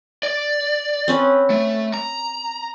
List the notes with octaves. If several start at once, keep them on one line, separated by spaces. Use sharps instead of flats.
D5
C4 C#4 B4
A3
A#5